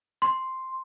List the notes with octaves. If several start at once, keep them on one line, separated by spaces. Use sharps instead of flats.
C6